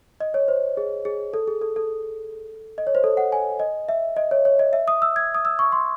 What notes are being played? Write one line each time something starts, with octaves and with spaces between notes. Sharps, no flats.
D#5
C#5
C5
G#4
G#4
A4
G#4
A4
A4
D#5
C#5
C5
A4
F#5
G#5
D#5
E5
D#5
C#5
C#5
D#5
E5
D#6
E6
G#6
D#6
E6
C#6
C6